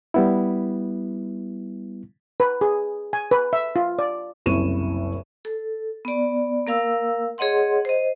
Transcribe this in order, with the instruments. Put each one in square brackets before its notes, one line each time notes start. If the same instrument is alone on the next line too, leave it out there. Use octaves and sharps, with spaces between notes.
[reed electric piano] G3 B3 E4
[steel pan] B4
G#4
G#5
B4
E5
F4
D5
[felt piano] F#1 C2 E4 C#6 D#7 E7
[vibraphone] A4
B3 D5
A#3 A#4 F5 E6
G#4 C#5 D#5 F#5 C6
C5 D#5